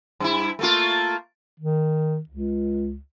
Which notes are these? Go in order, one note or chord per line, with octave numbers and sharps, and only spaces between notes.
G2 E4
A3 A#3 F4
D#3
C#2